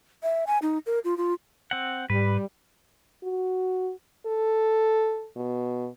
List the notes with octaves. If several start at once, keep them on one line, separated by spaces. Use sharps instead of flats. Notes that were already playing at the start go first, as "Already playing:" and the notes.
E5
G#5
D#4
A#4
F4
F4
C4 F#5
G#2 G3 B4
F#4
A4
B2